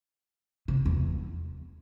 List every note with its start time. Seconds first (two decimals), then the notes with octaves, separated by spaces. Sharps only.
0.68 C3
0.86 E2